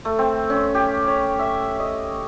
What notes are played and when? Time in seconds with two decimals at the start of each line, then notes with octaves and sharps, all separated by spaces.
0.05 A3
0.19 C4
0.50 C#4
0.75 G4
1.08 C#5
1.39 E5
1.80 D#5